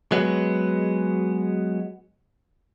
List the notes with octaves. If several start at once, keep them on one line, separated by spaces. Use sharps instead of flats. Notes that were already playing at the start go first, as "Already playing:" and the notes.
F#3 G#3 B3